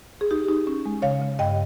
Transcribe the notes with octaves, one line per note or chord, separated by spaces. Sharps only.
G#4
D#4 G4
D#4
C#4
G#3
C#3 C#5 F5
C#3
G2 D#5 G5